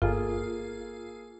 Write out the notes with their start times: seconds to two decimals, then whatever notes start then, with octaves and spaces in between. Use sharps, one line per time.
0.02 G1 A#3 F4 G#4 A4